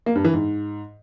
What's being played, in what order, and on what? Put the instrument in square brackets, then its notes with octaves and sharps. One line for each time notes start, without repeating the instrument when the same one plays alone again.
[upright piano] A#3
G2
E3
G#2